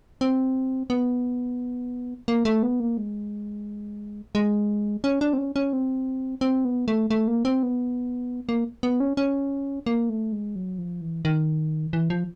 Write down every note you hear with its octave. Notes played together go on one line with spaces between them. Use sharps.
C4
B3
A#3
A3
B3
A#3
G#3
G#3
C#4
D4
C4
C#4
C#4
C4
C4
B3
A3
A3
A#3
C4
B3
A#3
B3
C#4
C#4
A#3
A3
G#3
F#3
F3
E3
D#3
E3
F3